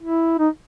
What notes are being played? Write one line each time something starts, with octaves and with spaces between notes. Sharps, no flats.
E4
D#4